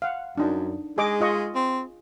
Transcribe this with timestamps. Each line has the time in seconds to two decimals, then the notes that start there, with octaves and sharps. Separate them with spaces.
0.02 F5 F#5
0.38 F#2 D4 D#4
0.98 G#3 G#4 D#5 D6
1.20 F4 D#5 C#6
1.55 C4